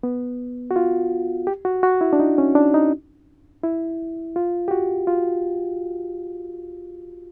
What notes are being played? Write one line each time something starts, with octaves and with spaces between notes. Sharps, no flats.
B3
F#4
F4
G4
F#4
F#4
E4
D4
D#4
C#4
D4
D#4
E4
F4
G4
F#4
F4